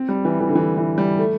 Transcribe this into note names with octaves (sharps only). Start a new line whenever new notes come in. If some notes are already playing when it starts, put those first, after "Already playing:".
Already playing: C4
G3
E3
E3
D3
E3
E3
G3
A3